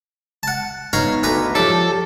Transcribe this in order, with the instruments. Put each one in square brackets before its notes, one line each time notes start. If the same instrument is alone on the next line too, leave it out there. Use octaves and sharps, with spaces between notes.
[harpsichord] F#5 A5
[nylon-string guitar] B3 D#4 E5 [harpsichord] C#5 F5 A#5
[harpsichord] D2 B4 A#5
[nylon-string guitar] F3 G4 C#5 [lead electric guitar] A4 [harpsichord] D5